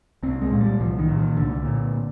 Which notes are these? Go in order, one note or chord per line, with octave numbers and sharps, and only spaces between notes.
C2 C4
G#3
A#2
G3
C2 F3
D#3
A#2
D#3
C2 D3
A#2